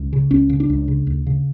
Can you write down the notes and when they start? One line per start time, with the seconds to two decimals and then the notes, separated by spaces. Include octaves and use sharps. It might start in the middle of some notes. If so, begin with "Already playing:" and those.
Already playing: C#2
0.13 C#3
0.31 C#2 C#4
0.49 C#3
0.60 D4
0.70 C#2
0.88 C#3
1.07 D2
1.27 C#3